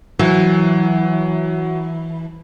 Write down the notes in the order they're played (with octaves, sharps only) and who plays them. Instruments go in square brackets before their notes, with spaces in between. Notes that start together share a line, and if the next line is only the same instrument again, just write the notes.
[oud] E3 [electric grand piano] F#3